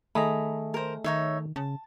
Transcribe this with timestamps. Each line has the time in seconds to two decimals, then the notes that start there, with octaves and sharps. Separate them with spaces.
0.15 D#3 A3 G#4 D#5 A#5 B5
0.74 A#4 C5
1.04 D#3 D#4 C#5 E5
1.56 C#3 A5